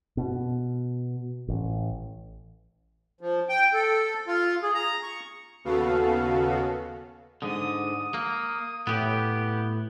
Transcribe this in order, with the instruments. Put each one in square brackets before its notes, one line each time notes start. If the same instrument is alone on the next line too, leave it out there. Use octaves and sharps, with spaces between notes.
[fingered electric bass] B2
A1
[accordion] F3
G5
A4
F4
G#4
A#5
C#6
[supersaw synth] D#2 C#3 B3 F#4 A4 F5
[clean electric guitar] G#2 D3 [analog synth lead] D#6
[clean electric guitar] A#3
[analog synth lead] A2 [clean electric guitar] B3 G4